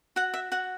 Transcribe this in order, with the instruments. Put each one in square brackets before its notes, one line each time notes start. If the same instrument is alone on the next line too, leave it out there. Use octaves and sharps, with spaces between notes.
[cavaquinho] F#4 F#5
E5
F#4 F#5